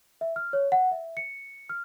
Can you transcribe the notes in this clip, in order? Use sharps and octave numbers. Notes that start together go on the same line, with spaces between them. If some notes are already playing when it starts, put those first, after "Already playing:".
E5
F6
C#5
F#5
E5
C#7
F6